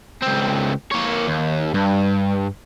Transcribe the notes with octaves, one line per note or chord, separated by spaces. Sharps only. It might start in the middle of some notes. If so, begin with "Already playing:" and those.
C#2 C4
A#3 C#5
D#2
G2